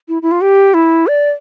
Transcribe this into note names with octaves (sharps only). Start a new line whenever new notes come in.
E4
E4
F4
G4
E4
D5